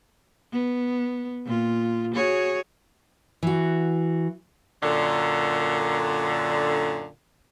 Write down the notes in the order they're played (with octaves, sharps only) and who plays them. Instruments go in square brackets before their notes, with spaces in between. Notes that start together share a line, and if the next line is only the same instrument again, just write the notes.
[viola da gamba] B3
A#2 F4
F#4 G#4 C#5
[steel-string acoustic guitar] E3 F#4
[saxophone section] F#2 A#2 D3